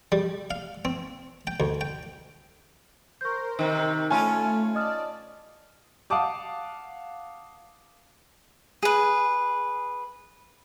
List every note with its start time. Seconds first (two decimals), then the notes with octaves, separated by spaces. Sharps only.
0.12 G3
0.51 F5
0.85 C4
1.47 G5
1.60 D2
1.81 G5
3.21 A#4 C5 C#6 G6
3.59 C3 D#3
4.10 A3 C#4 F4 G#5 A5 B5 C#6
4.75 D5 D#5 A5 D#6 F6
6.10 F5 F#5 A5 D6 D#6
8.83 G#4 B4